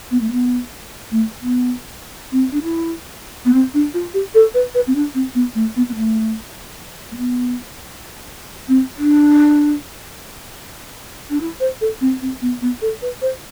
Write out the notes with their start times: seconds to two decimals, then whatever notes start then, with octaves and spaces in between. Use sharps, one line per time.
0.11 B3
0.21 A3
0.31 B3
1.12 A3
1.42 B3
2.32 C4
2.52 D4
2.63 E4
3.45 B3
3.54 C4
3.74 D4
3.94 F4
4.14 G4
4.35 A4
4.54 B4
4.75 B4
4.87 C4
4.95 D4
5.14 C4
5.35 B3
5.55 A3
5.76 B3
5.89 B3
5.95 A3
7.12 A3
7.16 B3
8.68 C4
8.98 D4
11.30 D4
11.40 E4
11.60 C5
11.81 A4
12.01 C4
12.21 C4
12.41 B3
12.61 B3
12.82 A4
13.02 B4
13.22 C5